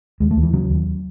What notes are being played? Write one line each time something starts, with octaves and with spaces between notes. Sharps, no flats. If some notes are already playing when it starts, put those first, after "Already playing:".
D#2 G#3
A3
D#2
E3
C#3 F#3
D#2